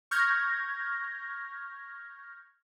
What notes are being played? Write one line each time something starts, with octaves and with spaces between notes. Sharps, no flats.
C#6 F6 G6 G#6 A#6